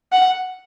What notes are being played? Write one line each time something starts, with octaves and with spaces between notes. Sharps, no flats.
F#5